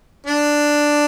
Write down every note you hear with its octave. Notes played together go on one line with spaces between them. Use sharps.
D4